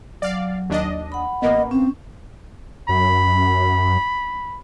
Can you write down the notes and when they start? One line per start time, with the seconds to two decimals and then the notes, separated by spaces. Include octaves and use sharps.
0.22 F#3 D5 F5
0.70 D#2 D4 D#5
1.12 F#5 B5
1.42 A1 A#3 B3 D#5
1.71 C4 C#4
2.89 F#2 B5